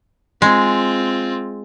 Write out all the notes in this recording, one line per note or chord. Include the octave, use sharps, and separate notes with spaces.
G#3 C4 F4